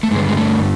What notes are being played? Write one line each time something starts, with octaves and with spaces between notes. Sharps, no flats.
A3
G2 D3 G#3
G#3
A3